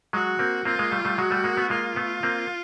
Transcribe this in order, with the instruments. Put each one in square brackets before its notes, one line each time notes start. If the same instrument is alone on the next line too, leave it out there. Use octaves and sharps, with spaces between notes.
[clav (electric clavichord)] F#3 G#3 [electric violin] F#4
[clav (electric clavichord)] A#3 C4
[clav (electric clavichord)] A#3 C4 [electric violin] F4
[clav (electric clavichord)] G#3 A#3
G3 A3
G3 A3
[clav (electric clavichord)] F#3 G#3 [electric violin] F#4
[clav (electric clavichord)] G3 A3
G#3 A#3
A3 B3
[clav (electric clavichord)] G#3 A#3 [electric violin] F4
[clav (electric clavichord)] A3 B3
A#3 C4